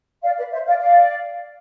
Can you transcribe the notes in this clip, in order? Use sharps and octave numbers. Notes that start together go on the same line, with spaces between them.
D5 F5
B4 D5
C5 E5
D5 F5
D5 F5